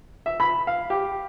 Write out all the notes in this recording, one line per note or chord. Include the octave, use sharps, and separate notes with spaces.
E5
B5
F5
G4